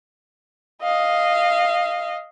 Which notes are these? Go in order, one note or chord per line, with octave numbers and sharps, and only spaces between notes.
D#5 F5